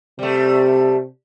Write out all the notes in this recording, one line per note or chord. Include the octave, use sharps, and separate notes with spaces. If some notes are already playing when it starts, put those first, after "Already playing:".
C3 G3 A3